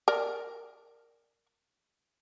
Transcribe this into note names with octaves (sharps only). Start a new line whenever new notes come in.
A#4 D5